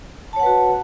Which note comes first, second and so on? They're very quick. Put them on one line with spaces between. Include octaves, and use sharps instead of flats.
A5 C#5 F#5 B4 F#4